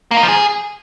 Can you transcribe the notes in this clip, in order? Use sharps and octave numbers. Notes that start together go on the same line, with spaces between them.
A#3
D#4
F3
G#4